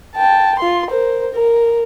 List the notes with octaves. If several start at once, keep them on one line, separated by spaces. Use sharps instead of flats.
G5 A5
F4 C6
A#4 C5
A#4